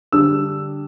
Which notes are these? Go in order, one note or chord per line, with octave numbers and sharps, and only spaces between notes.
D3 G3 D4 E6